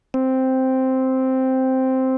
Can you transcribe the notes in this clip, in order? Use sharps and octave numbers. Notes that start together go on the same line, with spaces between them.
C4